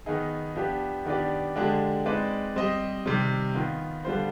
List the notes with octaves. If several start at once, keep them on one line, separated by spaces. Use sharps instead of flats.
D#3 B3 D#4 G#4
F3 B3 D4 G4
D#3 B3 D4 G4 D5
D3 F3 G#3 D4 G4
G#3 C4 D#4 B4 D5
G3 C4 G4 C5 D#5
C3 D#3 G3 C4
D#3 B3 F4
D3 G3 B3 F4 C5